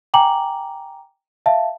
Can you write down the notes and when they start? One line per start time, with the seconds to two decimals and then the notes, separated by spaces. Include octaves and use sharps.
0.14 G5 G#5 A#5 D6 F#7
1.46 E5 F5 A5